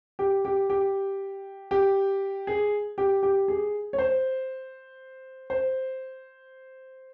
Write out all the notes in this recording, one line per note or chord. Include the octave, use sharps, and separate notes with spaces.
G4
G4
G4
G4
G#4
G4
G4
G#4
C#5
C5
C5